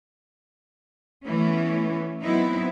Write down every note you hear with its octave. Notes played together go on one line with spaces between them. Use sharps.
E3 A3 B3 C#4
F#3 B3 C4 D#4 E4